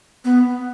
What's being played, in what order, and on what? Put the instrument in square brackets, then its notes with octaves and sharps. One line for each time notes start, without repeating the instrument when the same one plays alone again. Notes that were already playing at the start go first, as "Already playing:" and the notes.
[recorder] B3